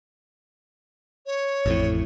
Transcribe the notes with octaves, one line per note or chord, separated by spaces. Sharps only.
C#5
A1 F2 A2